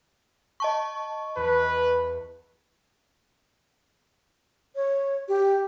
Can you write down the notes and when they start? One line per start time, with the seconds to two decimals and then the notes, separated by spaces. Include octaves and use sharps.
0.60 D#5 A5 C#6
1.36 E2 B4
4.76 C#5
5.28 G4